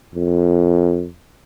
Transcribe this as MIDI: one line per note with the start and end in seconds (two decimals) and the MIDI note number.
0.15 1.08 41